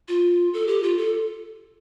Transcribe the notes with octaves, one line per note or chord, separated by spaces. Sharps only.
F4
A4
G4
F4
A4